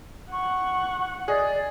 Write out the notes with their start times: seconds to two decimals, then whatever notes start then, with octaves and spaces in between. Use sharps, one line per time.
0.32 F#5 C#6
1.28 G#4 D5 D#5